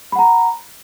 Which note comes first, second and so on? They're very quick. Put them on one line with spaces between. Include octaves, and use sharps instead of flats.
B5 F#5 A#5